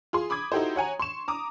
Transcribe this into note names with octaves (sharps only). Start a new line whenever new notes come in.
F4 G#4 C6
B5 D6 D#6 G#6
D#4 E4 F#4 G4 A4 C5
C#5 F#5 G#5 A#5
C6 C#6 E7
A#5 D6 D#6